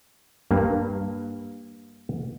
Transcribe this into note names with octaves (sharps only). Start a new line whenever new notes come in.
G2 A#3